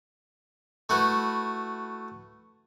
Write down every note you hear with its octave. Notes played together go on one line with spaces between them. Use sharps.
A3 E4 F#4 B4